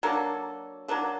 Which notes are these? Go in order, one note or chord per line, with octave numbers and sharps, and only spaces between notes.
F#3 A#3 D4 A4
F#3 A#3 D4 A4